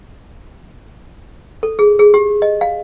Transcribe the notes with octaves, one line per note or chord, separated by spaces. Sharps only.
A4
G#4
G#4
G4
D#5
F5